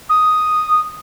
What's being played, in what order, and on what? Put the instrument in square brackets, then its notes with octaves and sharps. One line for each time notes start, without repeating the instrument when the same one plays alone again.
[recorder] D#6